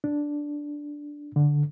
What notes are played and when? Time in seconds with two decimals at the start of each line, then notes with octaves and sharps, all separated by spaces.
0.04 D4
1.36 D3